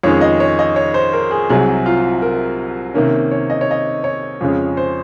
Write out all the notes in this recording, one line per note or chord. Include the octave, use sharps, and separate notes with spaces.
F2 D#3 G#3 C#4 C#5
D#5
C#5
D#5
C#5
C5
A#4
G#4
C2 C3 F#3 G#4
F4
A#4
C3 D#3 A#3 C#4
C#5
D#5
C#5
D#5
C#5
F2 C#3 G#3 C#4
C5